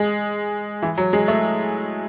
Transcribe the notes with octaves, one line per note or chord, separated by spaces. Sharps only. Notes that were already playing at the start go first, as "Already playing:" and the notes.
Already playing: G#3
E3
F#3
G#3
A3